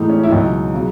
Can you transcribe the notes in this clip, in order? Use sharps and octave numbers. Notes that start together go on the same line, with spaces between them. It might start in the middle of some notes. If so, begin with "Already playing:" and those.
Already playing: A2 E3 G#3 D#4
C#4
E4
C#2 B2 F#3 D#4
C#3 F#3